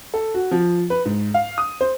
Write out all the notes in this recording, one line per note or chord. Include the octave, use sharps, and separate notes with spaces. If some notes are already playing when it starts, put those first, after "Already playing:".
A4
F#4
F3
B4
G#2
F5
D#6
C5